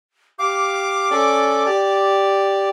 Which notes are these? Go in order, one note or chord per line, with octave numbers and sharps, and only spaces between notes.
G4 F5 D6
C#4 A4 D5
G4 D5